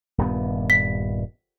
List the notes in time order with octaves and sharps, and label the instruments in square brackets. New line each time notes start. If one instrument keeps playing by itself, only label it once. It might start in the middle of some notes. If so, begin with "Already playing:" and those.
[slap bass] D#1 G2 B3
[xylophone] B6